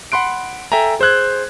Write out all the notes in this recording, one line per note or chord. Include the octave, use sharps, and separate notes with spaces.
F#5 B5 C6 F#6 D7
A4 E5 G5 G#5 A#5
G#4 C5 E6 F#6 G#6